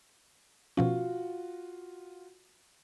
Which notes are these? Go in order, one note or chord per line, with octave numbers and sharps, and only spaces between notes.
B2 F3 C#4 F4 F#4